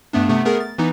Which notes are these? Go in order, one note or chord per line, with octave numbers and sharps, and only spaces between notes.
G2 A3 B3 D4
C3 A3 B3
A3 B3 G#4 A#4
A6
E3 B3 D#4